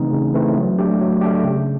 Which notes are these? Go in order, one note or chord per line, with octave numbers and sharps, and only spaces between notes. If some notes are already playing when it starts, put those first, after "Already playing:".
Already playing: C#3 E3 A3 C4 D#4
C#3
E3 A3 C4 D#4
F#3
A3 D4 G4
F#3
A3 D4 G4
C#3